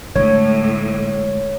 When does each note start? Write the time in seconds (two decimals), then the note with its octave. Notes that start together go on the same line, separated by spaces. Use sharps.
0.16 A2 D3 G#3 C#5